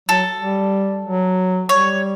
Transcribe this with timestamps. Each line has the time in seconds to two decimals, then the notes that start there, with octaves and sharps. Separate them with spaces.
0.09 F#3 A4
0.40 G3
1.05 F#3
1.69 G3 C#5